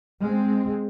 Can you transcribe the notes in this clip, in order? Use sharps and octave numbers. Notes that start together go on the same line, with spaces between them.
G#3 C4